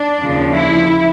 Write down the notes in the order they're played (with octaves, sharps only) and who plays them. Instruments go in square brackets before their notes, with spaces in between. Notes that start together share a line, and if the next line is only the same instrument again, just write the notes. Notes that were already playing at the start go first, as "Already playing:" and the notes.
Already playing: [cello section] D4
D#2 C#3 F3
E4